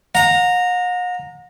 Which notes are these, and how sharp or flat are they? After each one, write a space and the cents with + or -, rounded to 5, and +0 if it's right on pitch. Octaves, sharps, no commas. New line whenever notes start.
F#5 -45 A#5 -10